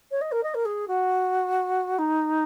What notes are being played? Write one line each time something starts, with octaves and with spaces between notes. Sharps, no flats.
C#5
D#5
A#4
D#5
A#4
G#4
F#4
D#4